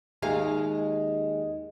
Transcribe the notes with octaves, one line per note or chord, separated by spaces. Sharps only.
D#2 G#3 F5